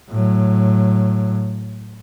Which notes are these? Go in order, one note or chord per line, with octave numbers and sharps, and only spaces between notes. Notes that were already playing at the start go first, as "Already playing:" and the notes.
A2 F#3